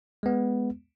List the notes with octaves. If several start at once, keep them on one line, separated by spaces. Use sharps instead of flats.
G#3 B3